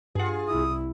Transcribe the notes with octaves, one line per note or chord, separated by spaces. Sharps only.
G2 F4 G#4 F#5
C2 E4 D#6